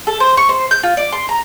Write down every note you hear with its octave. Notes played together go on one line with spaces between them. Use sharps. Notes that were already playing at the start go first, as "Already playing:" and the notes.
A4
C5
C#6
C5
G6
F4
D5
C6
A#5